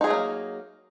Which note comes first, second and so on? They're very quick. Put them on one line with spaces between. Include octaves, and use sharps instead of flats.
D#4 G#4 F#3 A3 A#3